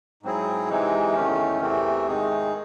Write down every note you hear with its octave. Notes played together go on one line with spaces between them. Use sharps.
G#2 F#3 C4 E4 G#4
C3 E3 G#3 D#4
E2 D#3 A3 C#4
E2 C3 E3 A3 C4
G#2 D#3 G#3 D#4 G#4